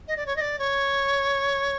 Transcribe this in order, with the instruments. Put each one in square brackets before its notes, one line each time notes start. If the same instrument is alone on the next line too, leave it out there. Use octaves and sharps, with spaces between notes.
[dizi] D#5
D5
C#5
D#5
D5
C#5